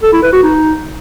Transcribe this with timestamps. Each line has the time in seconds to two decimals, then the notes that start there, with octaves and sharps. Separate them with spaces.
0.03 A4
0.13 E4
0.23 B4
0.33 F#4
0.43 D#4